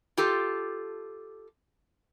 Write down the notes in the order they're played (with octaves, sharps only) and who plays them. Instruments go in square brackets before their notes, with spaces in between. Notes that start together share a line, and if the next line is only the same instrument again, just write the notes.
[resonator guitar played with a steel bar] F4 G4 A4